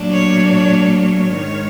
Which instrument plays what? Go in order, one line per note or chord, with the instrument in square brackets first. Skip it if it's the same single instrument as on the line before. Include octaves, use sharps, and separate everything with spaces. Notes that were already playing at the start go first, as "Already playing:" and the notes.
Already playing: [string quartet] A#2 F#3 A3 D4
C#5
C#5
C#5
G#2 D#3 G#3